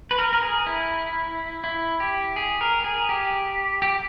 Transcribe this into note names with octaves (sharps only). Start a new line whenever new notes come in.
B4
A#4
A#4
G#4
E4
E4
G4
G#4
A#4
G#4
G4
G4